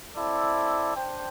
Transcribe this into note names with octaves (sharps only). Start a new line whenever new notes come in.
C4 E4 A4 D5
D4 C5 G5